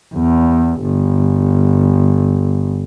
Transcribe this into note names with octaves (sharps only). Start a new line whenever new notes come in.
E2
G1